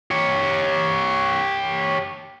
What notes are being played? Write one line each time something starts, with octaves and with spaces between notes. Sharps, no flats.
G4 C#5